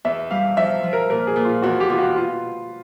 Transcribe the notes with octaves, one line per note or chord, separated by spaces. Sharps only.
E2 E5
G3 F5
F3 E5
F3
A#4
A#2 A#4
G#4
A#2
F4
E2 F#4
G4
B2 F4
F#4
F4